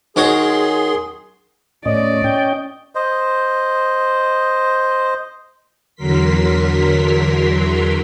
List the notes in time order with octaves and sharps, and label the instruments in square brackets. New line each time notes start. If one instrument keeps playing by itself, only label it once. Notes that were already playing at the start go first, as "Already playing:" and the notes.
[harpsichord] D#3 F#4 C#5 [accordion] G#4 C6
[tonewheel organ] A2 C#4 [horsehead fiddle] D5 [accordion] D#5
[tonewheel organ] C#4 G5
[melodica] C5 D#5
[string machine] E2 D3 F#3 A#4 C6 B6